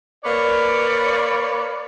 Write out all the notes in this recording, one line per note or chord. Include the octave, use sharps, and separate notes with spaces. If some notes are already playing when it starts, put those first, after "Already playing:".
A#3 B4 C#5 D5